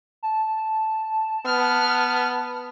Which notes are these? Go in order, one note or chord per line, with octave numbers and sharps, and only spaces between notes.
A5
B3 F6